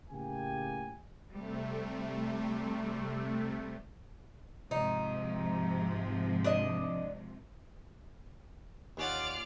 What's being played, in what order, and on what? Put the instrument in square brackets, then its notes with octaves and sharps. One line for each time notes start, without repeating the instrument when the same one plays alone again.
[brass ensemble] A2 C#3 A#3 G4 G5 G#5
[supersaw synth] C3 A3 [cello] G3
[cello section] G#2 C3 F3 [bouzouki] D#4
[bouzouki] D4 D#5
[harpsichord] D#2 C#4 F#5 [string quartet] F4 D5 F6